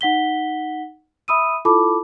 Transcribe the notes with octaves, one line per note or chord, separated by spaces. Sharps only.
D#4 F#5 B6 G7
E5 B5 D#6 E6 D#7
E4 F4 A4 A5 B5 D6